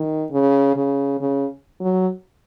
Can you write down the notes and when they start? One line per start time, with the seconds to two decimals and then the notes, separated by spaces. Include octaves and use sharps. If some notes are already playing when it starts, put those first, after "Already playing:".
Already playing: D#3
0.31 C#3
0.76 C#3
1.20 C#3
1.80 F#3